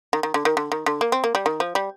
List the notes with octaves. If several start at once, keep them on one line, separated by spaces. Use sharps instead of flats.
D#3
D#3
D3
D#3
D3
D#3
D3
A#3
C4
A#3
G3
D#3
F3
G3